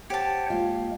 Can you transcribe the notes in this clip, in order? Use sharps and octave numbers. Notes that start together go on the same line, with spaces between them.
G4 C5 C#5 F#5 A5
G#3 A#3 F4